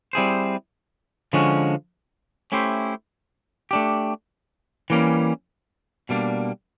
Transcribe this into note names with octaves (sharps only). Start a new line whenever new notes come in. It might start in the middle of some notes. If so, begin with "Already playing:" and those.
G3 C4 E4 G#4 C5
D3 F3 G#3 C#4 F#4
A3 C#4 E4 G4 C5
A3 D4 G4
E3 G3 A#3 C#4
B2 G3 A#3 D4